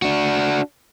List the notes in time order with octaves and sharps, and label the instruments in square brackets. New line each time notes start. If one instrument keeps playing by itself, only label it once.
[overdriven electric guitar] D4 F#4